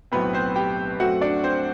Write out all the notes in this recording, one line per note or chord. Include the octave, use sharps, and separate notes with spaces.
B1 A2 F#3 B3 C4 B4
C4 C5
G4 G5
F#2 F#3 A3 C4 F#4 F#5
D4 D5
C4 C5